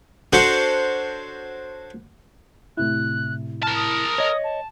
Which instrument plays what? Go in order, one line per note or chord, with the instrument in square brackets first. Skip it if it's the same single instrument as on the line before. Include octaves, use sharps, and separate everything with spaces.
[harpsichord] D4 F#4 A4 C5 C#5
[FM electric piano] A2 C3 E4 [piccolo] F#6
[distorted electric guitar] A#4 A5 [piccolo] F6
[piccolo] D#6
[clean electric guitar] C#5 D#5
[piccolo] A5